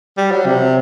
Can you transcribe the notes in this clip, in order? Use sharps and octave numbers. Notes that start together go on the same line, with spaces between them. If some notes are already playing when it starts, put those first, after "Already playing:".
G3
F#3
C3